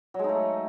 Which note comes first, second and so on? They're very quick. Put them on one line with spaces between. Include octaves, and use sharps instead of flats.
F#3 G#3 D#4 A3